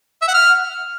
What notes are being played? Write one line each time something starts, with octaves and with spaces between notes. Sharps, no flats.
E5
F#5
F6